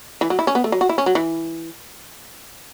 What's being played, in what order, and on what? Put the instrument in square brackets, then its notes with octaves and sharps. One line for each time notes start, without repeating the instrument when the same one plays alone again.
[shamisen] E3
F#3
E4
C#4
B3
A3
F#3
F#4
E4
C#4
F#3
E3